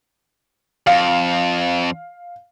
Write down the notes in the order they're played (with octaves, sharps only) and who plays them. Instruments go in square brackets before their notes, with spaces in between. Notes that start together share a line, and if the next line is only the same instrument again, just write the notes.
[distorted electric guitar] F2 [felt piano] F5